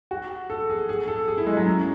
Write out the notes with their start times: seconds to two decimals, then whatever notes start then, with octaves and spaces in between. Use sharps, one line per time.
0.11 F#4
0.50 A4
0.70 G#4
0.89 G#4
1.08 A4
1.28 G#4
1.38 E4
1.47 G#3
1.57 F#3
1.66 C#4